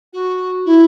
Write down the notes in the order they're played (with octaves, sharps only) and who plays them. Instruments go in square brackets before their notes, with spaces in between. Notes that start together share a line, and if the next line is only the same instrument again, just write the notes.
[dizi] F#4
E4